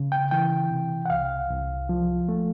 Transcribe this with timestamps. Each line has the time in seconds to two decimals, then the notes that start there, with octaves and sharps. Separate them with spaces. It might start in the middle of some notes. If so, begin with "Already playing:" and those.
Already playing: C#3
0.12 G5
0.31 E3 G5
0.71 C3
1.06 F#5
1.10 C2 F5
1.50 C2
1.89 F3
2.29 A3